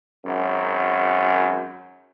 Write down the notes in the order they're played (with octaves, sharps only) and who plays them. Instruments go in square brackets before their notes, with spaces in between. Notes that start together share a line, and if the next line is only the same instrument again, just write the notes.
[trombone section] G#1 F#2